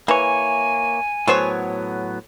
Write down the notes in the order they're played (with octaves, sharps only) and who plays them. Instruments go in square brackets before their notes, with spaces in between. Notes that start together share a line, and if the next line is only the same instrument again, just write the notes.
[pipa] E3 [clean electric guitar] A#3 C#5 [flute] G#5
[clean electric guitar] A2 F#3 B3 [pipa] A4 C5 C#5